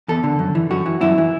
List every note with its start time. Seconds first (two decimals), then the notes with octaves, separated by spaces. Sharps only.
0.08 E2 A4
0.24 D3
0.39 F#2
0.55 E3
0.70 F#2 F#4
0.86 E3
1.01 F#2 E4
1.18 E3